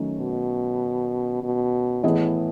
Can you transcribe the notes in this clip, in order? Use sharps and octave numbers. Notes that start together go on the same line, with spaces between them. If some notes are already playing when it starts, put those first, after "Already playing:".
Already playing: D#3 F#3 A3 C#4
B2
B2
A2 E3 B3 E4 G#4 D#5